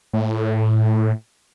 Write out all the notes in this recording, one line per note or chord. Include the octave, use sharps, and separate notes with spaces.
A2